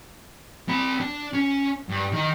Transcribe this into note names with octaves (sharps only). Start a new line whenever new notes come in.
C4 B5
D4
C#4
G2
D#3 D#4